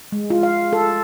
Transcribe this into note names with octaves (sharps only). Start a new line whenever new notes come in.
G#3
F4
F5
A4